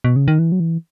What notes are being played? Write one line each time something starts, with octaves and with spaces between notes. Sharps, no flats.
B2
C#3
D#3
E3
F#3
E3